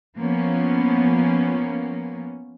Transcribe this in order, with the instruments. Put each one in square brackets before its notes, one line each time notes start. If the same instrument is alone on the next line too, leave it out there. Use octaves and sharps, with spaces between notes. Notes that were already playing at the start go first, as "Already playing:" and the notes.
[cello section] F3 A#3 B3 C#4